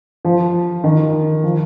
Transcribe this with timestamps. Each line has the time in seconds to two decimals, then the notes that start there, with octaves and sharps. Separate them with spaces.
0.25 F3
0.84 D#3
1.44 F3